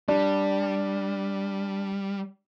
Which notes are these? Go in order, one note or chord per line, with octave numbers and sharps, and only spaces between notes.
G3 D4